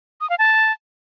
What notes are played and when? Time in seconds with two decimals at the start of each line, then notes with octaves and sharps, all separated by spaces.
0.21 D#6
0.30 F5
0.39 A5